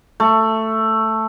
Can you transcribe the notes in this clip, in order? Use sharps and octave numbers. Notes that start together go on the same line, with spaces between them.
A3